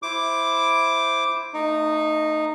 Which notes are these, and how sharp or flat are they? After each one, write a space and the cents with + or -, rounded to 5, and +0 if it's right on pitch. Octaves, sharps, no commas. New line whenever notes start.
E4 +0 C5 +0 D6 +0
A3 +25 D#4 -10